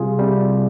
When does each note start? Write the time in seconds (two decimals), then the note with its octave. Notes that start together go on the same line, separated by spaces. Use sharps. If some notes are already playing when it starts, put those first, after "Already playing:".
Already playing: C3 G3 F4 G#4
0.19 C3 G3